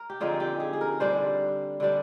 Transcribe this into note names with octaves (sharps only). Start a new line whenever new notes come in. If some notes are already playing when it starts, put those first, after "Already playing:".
Already playing: A#4
G4
D3 F3 C4 D#4 G#4
G4
G#4
G#4
A#4
D3 G3 D4 C5
D3 G3 D4